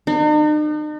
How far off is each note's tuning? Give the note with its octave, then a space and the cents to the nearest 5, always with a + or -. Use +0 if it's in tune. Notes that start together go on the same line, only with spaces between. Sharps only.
D#4 -45